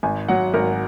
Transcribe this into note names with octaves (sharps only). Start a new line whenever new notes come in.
G#1 G#5
F#3 F#5
G#1 A#4